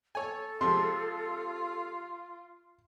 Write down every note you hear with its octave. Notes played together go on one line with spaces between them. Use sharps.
A4 C#5 G#5
C3 F3 G#3 F4 C6